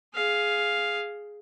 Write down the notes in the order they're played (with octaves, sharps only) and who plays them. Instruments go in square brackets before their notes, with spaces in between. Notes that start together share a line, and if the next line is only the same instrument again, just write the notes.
[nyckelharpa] G#4 F5